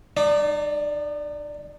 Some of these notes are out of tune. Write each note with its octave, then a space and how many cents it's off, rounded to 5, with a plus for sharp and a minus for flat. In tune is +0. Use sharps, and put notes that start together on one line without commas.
D#4 -40 D5 +0